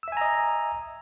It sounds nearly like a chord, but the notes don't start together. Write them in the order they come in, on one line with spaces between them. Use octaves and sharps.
E6 E5 G#5 A#5 D#5